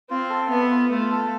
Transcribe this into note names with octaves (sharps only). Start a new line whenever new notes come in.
C4 F4
A4
B3 E5
F4
A3 F4
A4